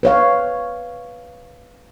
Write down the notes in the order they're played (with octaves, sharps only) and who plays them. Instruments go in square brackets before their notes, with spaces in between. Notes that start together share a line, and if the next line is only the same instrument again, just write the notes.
[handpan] B4 C#5 F5